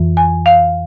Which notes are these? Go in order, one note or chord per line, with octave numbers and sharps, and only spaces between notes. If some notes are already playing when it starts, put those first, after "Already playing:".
Already playing: F2 E3
G#5
F5